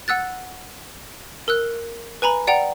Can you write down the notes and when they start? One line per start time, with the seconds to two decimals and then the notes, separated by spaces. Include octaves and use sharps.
0.08 F#5 E6 F#6 A6
1.48 A#4 E6 F#6
2.22 B4 G#5 A#5 B5
2.47 D5 F#5 G5 A#5 F7